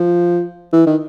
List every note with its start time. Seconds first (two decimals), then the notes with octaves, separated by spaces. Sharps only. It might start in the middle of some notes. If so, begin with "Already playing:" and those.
Already playing: F3
0.72 E3
0.86 D#3